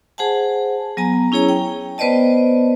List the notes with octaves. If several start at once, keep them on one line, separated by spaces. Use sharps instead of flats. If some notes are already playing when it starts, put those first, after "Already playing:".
G#4 C5 F#5 G#5 A5
F#3 B3 G#5 A#5
C#4 E4 G#4 C#5 A#5
G5
B3 B4 C5 D5 D#5 A5